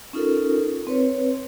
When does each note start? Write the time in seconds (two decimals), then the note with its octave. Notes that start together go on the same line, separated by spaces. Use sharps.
0.13 C#4 D#4 F4 A4 A#4
0.87 C4 B4 C#5